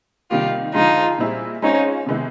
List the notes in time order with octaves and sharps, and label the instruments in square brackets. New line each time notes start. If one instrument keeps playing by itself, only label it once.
[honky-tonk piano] C3 D#3 G3 A#3 [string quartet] F4 G4
[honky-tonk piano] D3 F3 G#3 [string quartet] D#4 F4
[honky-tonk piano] A#2 G3 C4 E4 G#4
[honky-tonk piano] G#3 C4 F4 G#4 C#5 [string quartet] C#4 D#4
[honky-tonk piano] C3 D#3 G#3 B3 E4